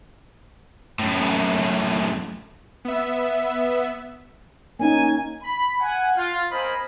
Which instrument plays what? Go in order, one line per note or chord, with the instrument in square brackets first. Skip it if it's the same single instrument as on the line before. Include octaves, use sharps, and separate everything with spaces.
[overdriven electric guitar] F#2 A2
[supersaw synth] B3 E5
[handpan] A#3 C#4 D#4 [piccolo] G#5
[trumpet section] B5
F#5 G#5
F4
C4 A#4 C5 D#5 G#5 B5